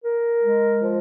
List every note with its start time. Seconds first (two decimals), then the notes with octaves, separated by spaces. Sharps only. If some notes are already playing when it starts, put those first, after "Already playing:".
0.04 A#4
0.42 G#3
0.82 F3